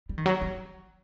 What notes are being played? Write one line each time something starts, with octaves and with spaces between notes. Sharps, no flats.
G3
D#3
F#3
F#3